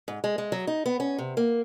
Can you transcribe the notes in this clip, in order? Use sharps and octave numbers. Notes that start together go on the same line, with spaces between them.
G#2
G#3
G#3
F#3
D#4
B3
C#4
C3
A#3